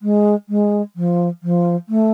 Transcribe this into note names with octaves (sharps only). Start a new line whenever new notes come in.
G#3
G#3
F3
F3
A3